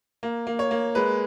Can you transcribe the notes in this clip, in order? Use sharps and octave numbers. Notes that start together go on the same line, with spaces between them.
A#3
A#3
C#5
A#3
G#3 B4